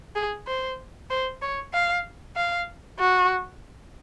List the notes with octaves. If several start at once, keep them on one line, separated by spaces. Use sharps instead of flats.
G#4
C5
C5
C#5
F5
F5
F#4